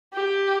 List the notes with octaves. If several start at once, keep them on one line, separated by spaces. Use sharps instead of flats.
G4